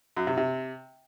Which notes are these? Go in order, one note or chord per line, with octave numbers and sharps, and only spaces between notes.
F#2
C3
C3